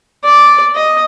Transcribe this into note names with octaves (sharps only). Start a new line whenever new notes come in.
D5
D#5